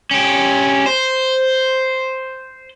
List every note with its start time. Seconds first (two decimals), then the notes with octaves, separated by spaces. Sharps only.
0.11 C#4 G4
0.86 C5